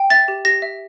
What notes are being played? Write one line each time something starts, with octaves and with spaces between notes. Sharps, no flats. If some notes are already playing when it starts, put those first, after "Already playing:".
Already playing: G5
E5 A6
G4
G4 A#6
E5